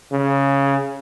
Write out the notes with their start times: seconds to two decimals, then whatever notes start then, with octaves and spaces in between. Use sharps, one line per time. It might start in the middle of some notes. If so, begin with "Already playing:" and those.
0.12 C#3